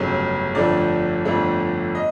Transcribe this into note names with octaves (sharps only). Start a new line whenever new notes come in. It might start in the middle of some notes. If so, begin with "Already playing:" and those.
Already playing: G1 F2 C#3 F#3 A3
G1 F2 D3 F3 A3 D5
G1 F2 D3 F3 A3
D#5